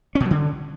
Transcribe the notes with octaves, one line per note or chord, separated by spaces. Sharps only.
C#4
B2
F#3
D3